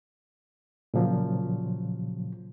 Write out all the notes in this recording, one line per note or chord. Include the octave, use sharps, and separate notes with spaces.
A#2 C#3 F3 F#3